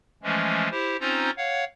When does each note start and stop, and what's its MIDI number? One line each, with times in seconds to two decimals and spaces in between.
0.23 0.68 52
0.23 0.68 53
0.23 0.68 56
0.23 0.68 57
0.23 0.68 61
0.71 0.97 64
0.71 0.97 67
0.71 0.97 72
1.00 1.30 60
1.00 1.30 61
1.00 1.30 63
1.00 1.30 65
1.00 1.30 72
1.00 1.30 82
1.37 1.64 73
1.37 1.64 77
1.37 1.64 78